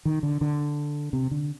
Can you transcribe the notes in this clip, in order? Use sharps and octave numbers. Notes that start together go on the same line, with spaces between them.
D#3
D3
D3
C3
D3